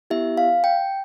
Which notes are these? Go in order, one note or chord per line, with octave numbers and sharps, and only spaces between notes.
B3 E4 G4 E5
F5
G5